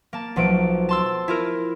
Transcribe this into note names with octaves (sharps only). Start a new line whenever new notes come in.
A#3 A5
B1 F3 A3 D7
A5 C6 E6
E4 F4 A#4